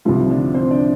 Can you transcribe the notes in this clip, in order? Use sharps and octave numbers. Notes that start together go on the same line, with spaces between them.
C2 C3 D#3 F3 G3 F4
D3 D4
C4 C5
D4 D5